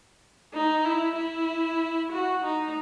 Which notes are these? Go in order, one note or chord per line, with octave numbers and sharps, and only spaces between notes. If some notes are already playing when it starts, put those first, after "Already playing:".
D#4
E4
E4
F#4
D#4